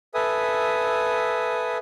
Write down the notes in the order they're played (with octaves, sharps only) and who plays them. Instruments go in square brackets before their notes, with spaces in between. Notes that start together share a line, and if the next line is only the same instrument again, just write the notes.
[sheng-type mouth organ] A4 B4 E5 G#5 D#6